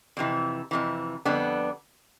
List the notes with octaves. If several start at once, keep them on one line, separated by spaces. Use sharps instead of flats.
F2 C3 E3
F2 C3 E3
F2 D3 G3 B3 D4